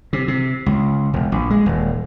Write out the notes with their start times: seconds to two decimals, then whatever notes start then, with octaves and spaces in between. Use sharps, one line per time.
0.13 C3
0.28 C3
0.66 C#2
1.13 E1
1.32 A#1
1.50 G#3
1.66 D#1